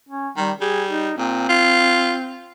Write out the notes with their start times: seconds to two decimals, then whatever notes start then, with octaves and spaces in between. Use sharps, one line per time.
0.09 C#4
0.37 D#3 G3
0.61 G3 G#4
0.89 D#4
1.18 A#2 C4
1.49 F4